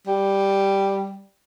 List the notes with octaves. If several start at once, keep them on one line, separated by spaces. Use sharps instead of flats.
G3